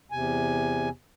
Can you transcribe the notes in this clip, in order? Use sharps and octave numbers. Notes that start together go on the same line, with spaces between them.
E2 C3 G#5